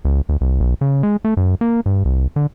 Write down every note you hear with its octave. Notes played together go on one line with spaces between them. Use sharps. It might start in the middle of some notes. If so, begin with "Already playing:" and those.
C#2
D2
C2
B1
C#3
G#3
A3
F#2
A#3
G2
C2
D3